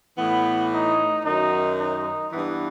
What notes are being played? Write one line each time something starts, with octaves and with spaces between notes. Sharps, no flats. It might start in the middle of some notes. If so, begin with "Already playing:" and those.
A2 E3 B3
D#4
F#2 D#3 F#3 D#4
D#4
G2 E3 B3